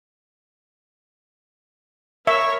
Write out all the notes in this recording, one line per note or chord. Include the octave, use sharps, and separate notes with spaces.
A#4 C#5 E5 C#6